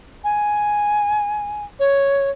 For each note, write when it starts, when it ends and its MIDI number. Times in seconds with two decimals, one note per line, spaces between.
0.24 1.64 80
1.79 2.30 73